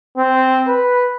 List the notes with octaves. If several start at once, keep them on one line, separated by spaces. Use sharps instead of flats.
C4
B4